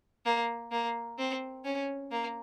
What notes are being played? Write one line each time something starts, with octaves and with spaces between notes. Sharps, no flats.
A#3
A#3
C4
C#4
A#3